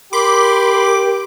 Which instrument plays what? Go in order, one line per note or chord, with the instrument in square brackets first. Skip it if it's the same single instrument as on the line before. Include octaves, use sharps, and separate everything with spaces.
[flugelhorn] G4 [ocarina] A#4 [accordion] B5 C6 [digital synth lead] D6